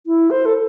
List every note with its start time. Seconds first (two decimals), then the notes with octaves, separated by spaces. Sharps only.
0.07 E4
0.31 C5
0.45 A4